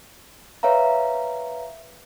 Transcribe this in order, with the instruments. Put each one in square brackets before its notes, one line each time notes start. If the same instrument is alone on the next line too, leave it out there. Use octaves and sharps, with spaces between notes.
[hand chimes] B4 C#5 E5 F5 A#5